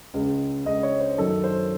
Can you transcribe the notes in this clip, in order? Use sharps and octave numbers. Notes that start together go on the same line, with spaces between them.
C#2 C#3 G#3
C#2 C#3 G#3 D#5
C#5
C5
F#2 D#3 F#3 A4
C5